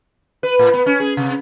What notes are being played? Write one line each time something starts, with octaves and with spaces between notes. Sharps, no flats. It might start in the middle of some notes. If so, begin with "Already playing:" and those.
B4
A2
B3
C#4
G#4
C3